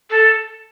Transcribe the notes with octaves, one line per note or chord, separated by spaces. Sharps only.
A4